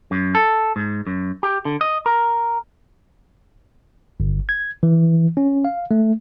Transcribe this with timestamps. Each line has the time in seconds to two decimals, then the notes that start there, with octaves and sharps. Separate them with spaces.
0.11 F#2
0.35 A4
0.76 G#2
1.07 F#2
1.43 G4
1.65 D3
1.81 D#5
2.06 A#4
4.20 G1
4.49 G#6
4.83 E3
5.37 C#4
5.65 F5
5.91 A3